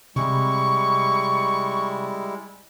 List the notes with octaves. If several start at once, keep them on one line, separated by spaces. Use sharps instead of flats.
C3 G3 G#3 E4 C#6